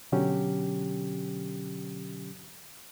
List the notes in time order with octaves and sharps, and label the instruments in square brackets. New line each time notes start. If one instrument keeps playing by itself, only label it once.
[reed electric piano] B2 D3 F#3 C#4 G4